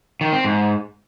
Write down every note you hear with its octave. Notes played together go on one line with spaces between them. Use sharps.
D#3
C4
G#2